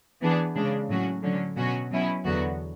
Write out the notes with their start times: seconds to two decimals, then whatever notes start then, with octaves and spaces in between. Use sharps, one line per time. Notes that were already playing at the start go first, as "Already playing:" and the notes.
0.21 E3 B3 D4 G#4
0.55 C#3 G#3 D4
0.89 A2 F#3 C#4 F#4
1.23 D3 F#3 C#4
1.57 B2 F#3 C#4 F#4
1.92 B2 F#3 C#4 E4
2.25 E2 D3 F#3 B3 F#4